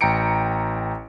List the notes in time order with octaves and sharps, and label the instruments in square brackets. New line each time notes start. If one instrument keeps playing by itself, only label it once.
[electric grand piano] A1 G5 A#5 C#7 D7